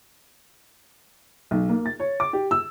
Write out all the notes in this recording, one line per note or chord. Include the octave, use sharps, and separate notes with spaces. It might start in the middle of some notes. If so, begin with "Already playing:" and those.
B1
A#3
A6
C#5
D6
G4
E6